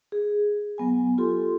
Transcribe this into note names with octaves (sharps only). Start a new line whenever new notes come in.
G#4
F#3 B3 G#5
F4 G4 A4 C6